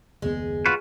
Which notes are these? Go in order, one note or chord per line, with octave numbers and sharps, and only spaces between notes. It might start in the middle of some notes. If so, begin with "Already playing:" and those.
F#1 D#2 G#3 B3
F4 F#4 B4